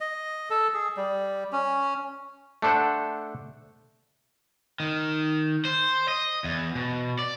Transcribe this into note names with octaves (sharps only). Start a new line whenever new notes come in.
D#5
A4
G#4
G3
C#4
A3 D4 A4 C5 F#5
D#3
C5
D#5
E2
B2
D5